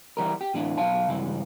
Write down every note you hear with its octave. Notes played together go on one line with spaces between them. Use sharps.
E3 G3 A#4
G4
A2 E3 D4
B1 F5 A5
C#2 G2 E3